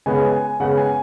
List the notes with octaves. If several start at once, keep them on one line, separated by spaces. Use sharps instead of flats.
C#3 G#3 B3 G#5
G#5
C#3 G#3 B3 F#5
G#5